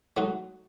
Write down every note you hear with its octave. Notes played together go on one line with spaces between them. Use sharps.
F#3 A3 D#4 F#4